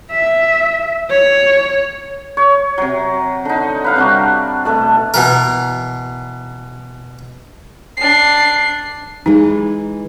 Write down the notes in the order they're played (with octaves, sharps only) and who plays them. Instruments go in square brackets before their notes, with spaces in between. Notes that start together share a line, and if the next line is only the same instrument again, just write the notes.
[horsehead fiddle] E5
C#5
[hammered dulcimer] C#5
C3 F#3
D3 D#4
B4 F5 F#5
C3 G3 D4 F#4
B2 A3 A4
[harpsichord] B2 E3 A#4
[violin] D4 C7
[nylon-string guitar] E3 G#3 [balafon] D#4